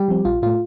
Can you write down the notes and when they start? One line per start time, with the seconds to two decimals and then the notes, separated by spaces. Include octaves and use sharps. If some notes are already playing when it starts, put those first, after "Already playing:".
Already playing: G3 G4
0.08 F3 C4
0.25 A#1 F4
0.42 A2 A3 F4